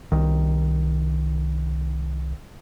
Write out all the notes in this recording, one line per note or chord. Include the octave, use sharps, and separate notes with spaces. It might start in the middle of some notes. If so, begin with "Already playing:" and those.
C2 D#3